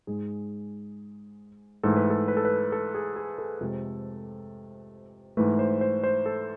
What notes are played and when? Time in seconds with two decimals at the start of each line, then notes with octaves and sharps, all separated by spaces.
0.07 G#2 G#3 G#4
1.83 G#2 E3 A3 A4
1.97 B4
2.10 A4
2.28 B4
2.37 A4
2.45 B4
2.72 A4
2.95 G#4
3.16 G#4
3.38 A4
3.61 F2 C3 G#3
5.37 G#2 E3 A3 B4
5.59 C5
5.81 C5
6.04 C5
6.26 A4